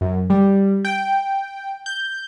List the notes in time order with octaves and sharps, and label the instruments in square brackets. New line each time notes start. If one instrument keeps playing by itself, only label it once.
[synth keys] F#2
G3
G5
G6